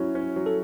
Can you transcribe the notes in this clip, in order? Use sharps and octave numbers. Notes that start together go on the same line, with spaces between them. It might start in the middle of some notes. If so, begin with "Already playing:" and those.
Already playing: F#3 C#4 E4
C#4
F#3
A4